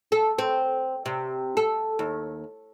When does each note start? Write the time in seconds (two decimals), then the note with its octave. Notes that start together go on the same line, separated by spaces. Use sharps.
0.12 A4
0.39 C4
1.06 C3
1.57 A4
1.99 D#2